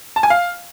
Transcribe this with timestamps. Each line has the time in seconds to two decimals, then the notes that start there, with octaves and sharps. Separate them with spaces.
0.16 A5
0.23 G#5
0.30 F5